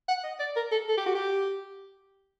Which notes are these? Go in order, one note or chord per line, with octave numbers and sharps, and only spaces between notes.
F#5
D#5
D5
A#4
A4
A4
G4
F#4
G4